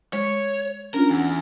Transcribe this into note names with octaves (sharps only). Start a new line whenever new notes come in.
G#3 C#5
C#4 D4 F4 A#4
E2